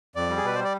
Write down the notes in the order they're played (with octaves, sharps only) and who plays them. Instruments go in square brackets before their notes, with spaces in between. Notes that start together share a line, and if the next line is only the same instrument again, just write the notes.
[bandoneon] F2 D5
G3
G#4
B2 B4
G3 C5
D5